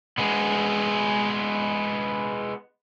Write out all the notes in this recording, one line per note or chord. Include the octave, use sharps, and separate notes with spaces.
G#3 B3